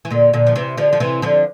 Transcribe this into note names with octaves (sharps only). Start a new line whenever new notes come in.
E3
A#2 D3
A#2 D3
F3
C3 E3
D3 F3
F3
C3 E3
D3 F3